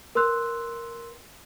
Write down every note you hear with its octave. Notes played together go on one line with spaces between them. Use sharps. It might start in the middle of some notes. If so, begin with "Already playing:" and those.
A#4 B4 C6 E6 F#6